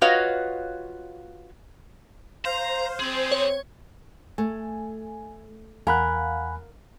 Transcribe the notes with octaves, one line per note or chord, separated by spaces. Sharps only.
F4 F#4 B4 C#5 D#5 F5
C5 F5 A#5
C4 G#4 D5
C#5
A3 G#5
E2 A#4 F5 F#5 G#5 B5 F#6